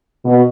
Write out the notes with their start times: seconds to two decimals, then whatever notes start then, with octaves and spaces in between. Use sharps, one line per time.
0.25 B2